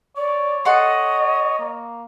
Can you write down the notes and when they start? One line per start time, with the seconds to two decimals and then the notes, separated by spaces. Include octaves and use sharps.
0.17 C#5 D5
0.65 A4 D#5 F#5 C6
1.59 A#3